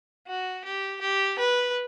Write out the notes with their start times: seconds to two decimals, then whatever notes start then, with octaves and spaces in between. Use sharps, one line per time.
0.27 F#4
0.64 G4
1.01 G4
1.39 B4